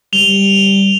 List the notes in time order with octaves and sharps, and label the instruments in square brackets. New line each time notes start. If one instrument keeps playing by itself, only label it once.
[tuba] G3 [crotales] F7 G7